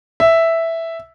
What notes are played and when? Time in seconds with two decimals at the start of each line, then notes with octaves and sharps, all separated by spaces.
0.20 E5